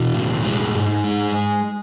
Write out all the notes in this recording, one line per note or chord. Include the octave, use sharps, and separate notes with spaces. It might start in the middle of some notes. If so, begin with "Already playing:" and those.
Already playing: B2 E3
A2
G#3
G#2
G#3